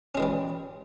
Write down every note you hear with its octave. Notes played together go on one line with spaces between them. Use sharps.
E3 G3 G#3 C#4